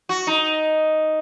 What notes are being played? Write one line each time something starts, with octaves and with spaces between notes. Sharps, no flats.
F#4
D#4